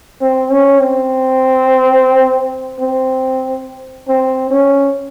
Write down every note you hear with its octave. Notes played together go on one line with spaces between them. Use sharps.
C4
C#4
C4
C4
C4
C#4